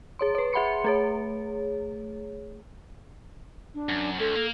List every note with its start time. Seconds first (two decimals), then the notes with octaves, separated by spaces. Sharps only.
0.19 G#4 C#5 C6
0.35 B4 C#5
0.53 G#4 E5 F#5 B5 C6 C#7
0.84 A3 G#4 C#5
3.75 D4
3.89 F#2
4.20 C#2 A4
4.36 A#3